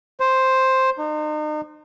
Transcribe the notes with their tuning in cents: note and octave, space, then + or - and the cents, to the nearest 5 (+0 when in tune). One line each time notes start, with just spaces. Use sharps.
C5 +5
D#4 -40